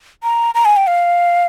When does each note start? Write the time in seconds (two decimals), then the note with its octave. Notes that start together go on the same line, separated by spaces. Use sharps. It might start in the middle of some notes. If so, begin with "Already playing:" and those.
0.23 A#5
0.55 A#5
0.65 G#5
0.76 G5
0.87 F5